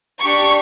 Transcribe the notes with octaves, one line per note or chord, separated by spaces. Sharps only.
D4 G4 C#6